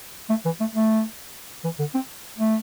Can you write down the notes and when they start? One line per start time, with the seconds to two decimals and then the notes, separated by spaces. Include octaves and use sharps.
0.29 A3
0.45 E3
0.60 A3
0.75 A3
1.64 E3
1.79 D3
1.94 C4
2.38 A3